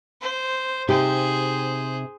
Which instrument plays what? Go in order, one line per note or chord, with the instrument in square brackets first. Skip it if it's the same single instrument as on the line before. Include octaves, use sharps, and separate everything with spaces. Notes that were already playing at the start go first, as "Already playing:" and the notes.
[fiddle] C5
[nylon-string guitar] C3 D#4 G4 [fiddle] G#4 C5